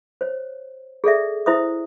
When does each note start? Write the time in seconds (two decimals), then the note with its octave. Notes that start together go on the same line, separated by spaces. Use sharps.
0.21 C5 C#5
1.04 G#4 A4 D5 E5
1.46 E4 C5 E5 D#6